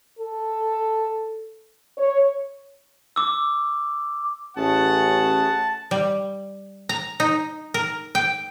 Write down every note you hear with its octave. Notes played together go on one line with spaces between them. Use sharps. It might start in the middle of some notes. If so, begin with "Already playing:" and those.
A4
C#5
D6 E6
A1 A3 C#4 G#4 F#5 A5
G3
A#5
D#4
A#4
G5